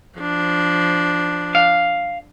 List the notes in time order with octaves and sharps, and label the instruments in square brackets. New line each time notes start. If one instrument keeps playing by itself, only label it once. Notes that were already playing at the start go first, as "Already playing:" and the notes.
[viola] F3 D4
[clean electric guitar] F5